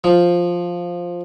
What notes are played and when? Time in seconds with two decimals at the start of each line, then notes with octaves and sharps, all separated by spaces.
0.04 F3